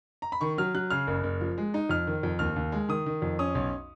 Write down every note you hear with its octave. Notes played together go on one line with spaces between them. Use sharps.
A#5
B5
D#3 C#6
F#3 F6
F#3 F#6
C#3 F6
F#1
F#1
F3
G#3
D#4
F2 F6
D#3
F2
D#2 F6
D#2
G#3
D#3 D#6
D#3
F2
C#4 D#6
B1